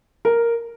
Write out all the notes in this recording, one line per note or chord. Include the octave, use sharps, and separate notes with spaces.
A#4